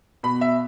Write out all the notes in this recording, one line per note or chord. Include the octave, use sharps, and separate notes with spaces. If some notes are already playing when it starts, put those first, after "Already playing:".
B2 B5
E5